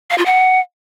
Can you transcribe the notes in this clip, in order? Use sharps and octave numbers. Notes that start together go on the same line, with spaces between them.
F5
F4
F#5